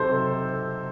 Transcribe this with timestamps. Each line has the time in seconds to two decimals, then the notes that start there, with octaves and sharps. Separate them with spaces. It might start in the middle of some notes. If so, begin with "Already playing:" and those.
Already playing: C3 F#3 C4 D#4 A4 C5